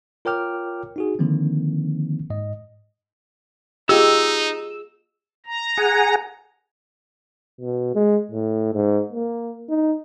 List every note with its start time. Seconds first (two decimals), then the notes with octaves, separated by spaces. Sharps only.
0.25 F4 A#4 C#5 G5 D6 F6
0.96 D#4 F#4 G#4
1.19 D3 D#3 F3 A#3 C4
2.30 G#2 D#5
3.89 D#4 F4 G4 G#4 D#5 E6
5.46 A#5
5.77 G#4 F#5 G#5
7.61 B2
7.95 G#3
8.31 A2
8.73 G#2
9.13 A#3
9.69 D#4